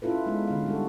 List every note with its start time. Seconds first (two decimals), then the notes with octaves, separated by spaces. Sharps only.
0.02 C#4 E4 F4 A4 B4
0.26 G#3 B3 D#4
0.47 D3 C#4 F5
0.66 G3 F#4 A4